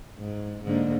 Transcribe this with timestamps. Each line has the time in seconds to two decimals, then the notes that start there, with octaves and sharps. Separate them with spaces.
0.19 G#2
0.63 G#2 D3 A#3